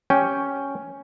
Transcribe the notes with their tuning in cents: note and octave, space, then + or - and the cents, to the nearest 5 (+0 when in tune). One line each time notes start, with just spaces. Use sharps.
C#4 +0 G4 +0 G5 +0